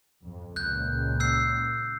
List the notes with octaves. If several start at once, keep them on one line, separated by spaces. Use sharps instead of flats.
F2
C#2 A#2 F#6 G6
E6 G6 C7